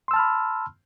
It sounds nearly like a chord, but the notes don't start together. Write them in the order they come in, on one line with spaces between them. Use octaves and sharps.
C6 E6 A5 F6 B5